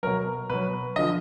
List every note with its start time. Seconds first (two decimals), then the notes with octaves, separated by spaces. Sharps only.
0.03 B2 F#3 A#4
0.50 B2 F#3 B4
0.96 D3 F3 D#5